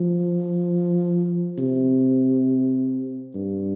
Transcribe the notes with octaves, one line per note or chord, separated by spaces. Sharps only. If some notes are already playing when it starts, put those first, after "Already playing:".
Already playing: F3
C3
G2